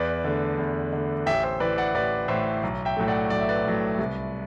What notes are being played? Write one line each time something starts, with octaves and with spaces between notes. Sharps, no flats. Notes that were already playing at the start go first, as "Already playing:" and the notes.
Already playing: E2 B4 D5
D3 A3
E2
D3 A3
A1 E5 G5
C5 E5
A2 E3 B4 D5
D5 F#5
A1 B4 D5
A2 E3 C5 E5
B1
E5 G5
A2 F#3 A3
D5 F#5
B1 D5
E5
B4 D5
A2 F#3 A3
C2